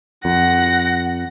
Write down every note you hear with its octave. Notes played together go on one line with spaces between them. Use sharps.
F2 F#5 A#6